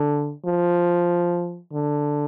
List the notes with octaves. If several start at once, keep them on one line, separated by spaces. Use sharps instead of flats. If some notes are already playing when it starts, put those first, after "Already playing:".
Already playing: D3
F3
D3